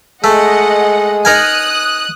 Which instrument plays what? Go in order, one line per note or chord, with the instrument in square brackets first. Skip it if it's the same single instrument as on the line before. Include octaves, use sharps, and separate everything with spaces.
[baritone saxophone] G#3 [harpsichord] A3 [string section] D#5 F#5
[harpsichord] D#4 A#4 G#5 [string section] D#6 F#6